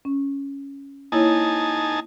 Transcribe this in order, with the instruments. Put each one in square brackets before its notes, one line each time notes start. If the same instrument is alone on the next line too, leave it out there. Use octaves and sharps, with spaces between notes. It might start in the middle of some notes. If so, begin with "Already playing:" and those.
[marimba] C#4
[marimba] A#3 E4 C#5 [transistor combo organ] D#4 G#5 A5